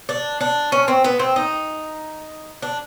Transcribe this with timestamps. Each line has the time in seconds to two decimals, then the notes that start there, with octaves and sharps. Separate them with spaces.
0.09 D4
0.41 D4
0.72 C#4
0.88 C4
1.04 B3
1.19 C4
1.36 D#4
2.62 D4